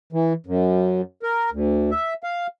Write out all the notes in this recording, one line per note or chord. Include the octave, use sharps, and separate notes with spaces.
E3
F#2
A#4
D2
E5
F5